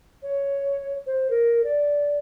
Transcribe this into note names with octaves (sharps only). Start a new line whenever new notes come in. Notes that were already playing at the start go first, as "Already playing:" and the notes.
C#5
C5
A#4
D5